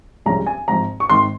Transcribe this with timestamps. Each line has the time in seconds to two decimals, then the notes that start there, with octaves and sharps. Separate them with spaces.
0.26 C2 C3 F3 G#3 C#4 A#5
0.47 G#5
0.68 G#1 G#2 F3 A#5
1.00 C#6
1.09 G#1 G#2 D#3 C6